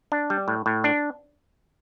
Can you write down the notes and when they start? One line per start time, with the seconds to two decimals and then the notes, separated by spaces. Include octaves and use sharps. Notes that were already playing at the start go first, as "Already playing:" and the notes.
0.12 D4
0.30 G3
0.48 A2
0.66 A2
0.84 D4